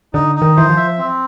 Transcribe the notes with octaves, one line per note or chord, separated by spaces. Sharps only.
D3 D#4
D#4
D#3
E3 C5
F3
E5
C4